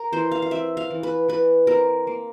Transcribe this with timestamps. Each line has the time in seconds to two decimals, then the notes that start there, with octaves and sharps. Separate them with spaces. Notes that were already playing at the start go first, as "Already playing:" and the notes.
Already playing: A#4
0.13 E3 C5
0.31 F5
0.42 F5
0.51 C4 E5
0.77 F5
0.91 E3
1.03 B4
1.28 E3 B4
1.67 C4 A#4
2.07 A#3